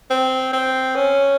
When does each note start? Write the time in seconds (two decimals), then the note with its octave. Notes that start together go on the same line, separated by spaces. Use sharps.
0.10 C4
0.53 C4
0.96 C#4